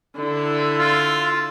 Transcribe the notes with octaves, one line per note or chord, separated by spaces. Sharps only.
D3 E4
F4